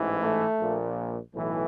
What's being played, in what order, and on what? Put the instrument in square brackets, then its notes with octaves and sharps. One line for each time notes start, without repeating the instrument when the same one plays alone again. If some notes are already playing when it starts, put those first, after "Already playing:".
Already playing: [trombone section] A1 G#2 E3
A3
A#1 A#2
B1 A2 E3